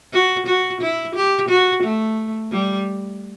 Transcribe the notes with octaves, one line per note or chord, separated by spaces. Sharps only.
F#4
F#4
E4
G4
F#4
A3
G3